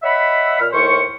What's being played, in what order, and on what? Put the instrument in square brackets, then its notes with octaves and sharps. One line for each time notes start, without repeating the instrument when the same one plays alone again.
[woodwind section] C#5 D#5 E5 F#5 B5
A#2 F6
D#2 A2 C5 C#6